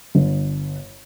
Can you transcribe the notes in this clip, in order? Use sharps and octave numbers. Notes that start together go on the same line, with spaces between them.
G1